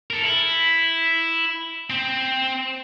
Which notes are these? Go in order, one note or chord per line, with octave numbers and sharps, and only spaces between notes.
A4 A#4
E4
C4